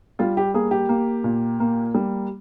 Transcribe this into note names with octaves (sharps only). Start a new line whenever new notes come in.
G3 F4
G4
A#3 G#4
G4
A#3
A#2
A#3
G3